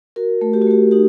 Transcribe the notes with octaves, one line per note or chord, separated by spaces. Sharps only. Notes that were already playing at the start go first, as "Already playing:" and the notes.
F#4 A#4
A3
G4
F#4
A3 G4
D#4 G4